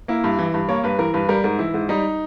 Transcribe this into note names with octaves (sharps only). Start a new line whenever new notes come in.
A#3 E4
G2
E3
G2
A#3 C#5
G2 B4
E3 A#4
G2 B4
G3 A#4
G#2 A#4
E3 E4
G#2
G3 D#4